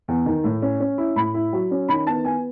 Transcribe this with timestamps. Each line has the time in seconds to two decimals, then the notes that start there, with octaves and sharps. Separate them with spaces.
0.08 E2
0.26 D#3
0.44 A2
0.62 C#4
0.80 C#4
0.98 E4
1.16 A2 B5
1.34 E4
1.53 F#3
1.71 C#4
1.88 D#3 B5
2.07 B3 A5
2.25 B3 G#5